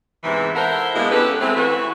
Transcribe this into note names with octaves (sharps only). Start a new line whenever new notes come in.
E2 G#2 C3 E3
E4 A4 A#4 C5 E5 F#5
B2 D3 G#3 A#3 E4
B3 C#4 G4 A4 B4
E3 G#3 A3 C4
E3 F#4 B4